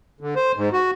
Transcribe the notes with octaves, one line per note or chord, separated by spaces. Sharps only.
D3
C5
G#2
F#4